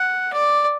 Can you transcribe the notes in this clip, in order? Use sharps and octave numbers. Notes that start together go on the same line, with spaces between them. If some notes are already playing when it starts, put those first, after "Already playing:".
Already playing: F#5
D5